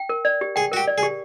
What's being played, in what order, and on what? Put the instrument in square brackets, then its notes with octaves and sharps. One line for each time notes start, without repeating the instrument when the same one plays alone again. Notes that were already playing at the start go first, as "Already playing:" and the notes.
Already playing: [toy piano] G5
A#4
D5
G4
[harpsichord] G#4 [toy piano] G5
[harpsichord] F#4 [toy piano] A#4
[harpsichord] G4
[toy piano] D5
[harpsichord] G#4
[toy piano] G4